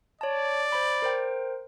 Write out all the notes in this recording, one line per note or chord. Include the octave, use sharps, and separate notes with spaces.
C#5 D5 A5
C5 B5
A#4 C5 G5